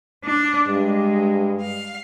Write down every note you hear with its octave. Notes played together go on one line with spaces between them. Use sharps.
D4
G2 G#3
F5